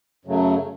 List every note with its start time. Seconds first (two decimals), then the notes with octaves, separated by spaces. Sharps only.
0.25 F#2 C#3 F#3 A3